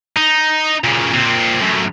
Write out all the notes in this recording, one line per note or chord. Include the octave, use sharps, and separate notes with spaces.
D#4
A#2 C#3
A#2 C4
F#2 A2